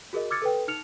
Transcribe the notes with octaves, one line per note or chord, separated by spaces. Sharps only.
F#4 G#4 A#4 D#5
D6 E6 F6 G#6 A6 C#7
A4 B4 G5
D#4 F6 C#7 F7